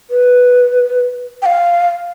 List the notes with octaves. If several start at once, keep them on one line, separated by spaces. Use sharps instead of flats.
B4
G5
F5